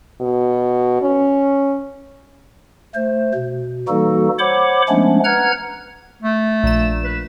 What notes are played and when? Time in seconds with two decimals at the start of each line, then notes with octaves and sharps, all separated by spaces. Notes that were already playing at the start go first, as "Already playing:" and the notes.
0.21 B2
1.02 C#4
2.95 A3 C5
3.35 B2
3.88 E3 G3 A#3 D#4 F#4 A4
4.39 C5 C#5 F#5 B5 D6
4.89 F3 G#3 A3 B3 C#4 D4
5.24 B4 F#5 A#5 F6 G#6
6.22 A3
6.64 A#1 E7
7.04 B4